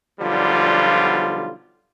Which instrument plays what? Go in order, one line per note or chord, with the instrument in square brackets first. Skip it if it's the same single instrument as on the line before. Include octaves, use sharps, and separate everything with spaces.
[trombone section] B1 D3 F3 G3 F4